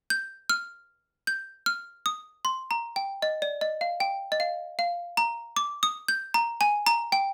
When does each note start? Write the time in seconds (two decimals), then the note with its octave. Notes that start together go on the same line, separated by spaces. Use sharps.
0.10 G6
0.50 F6
1.27 G6
1.66 F6
2.06 D#6
2.45 C6
2.71 A#5
2.96 G5
3.22 D#5
3.42 D5
3.61 D#5
3.81 F5
4.00 G5
4.32 D#5
4.40 F5
4.79 F5
5.17 A#5
5.56 D6
5.83 D#6
6.08 G6
6.34 A#5
6.61 G#5
6.86 A#5
7.12 G5